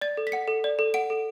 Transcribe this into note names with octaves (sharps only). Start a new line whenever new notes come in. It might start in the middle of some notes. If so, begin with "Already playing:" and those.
D5 A6
A4
B6
F#5 C#7
A4
D5
A4
F#5 D7
A4